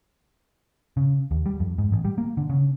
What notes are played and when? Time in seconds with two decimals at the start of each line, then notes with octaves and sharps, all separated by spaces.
0.97 C#3
1.31 D#2
1.46 G3
1.60 F2
1.78 G#2
1.92 A1
2.05 G3
2.18 A#3
2.37 D3
2.50 C#3